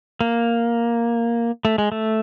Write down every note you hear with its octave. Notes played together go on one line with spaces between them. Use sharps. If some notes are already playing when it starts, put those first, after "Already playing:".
A#3
A3
G#3
A3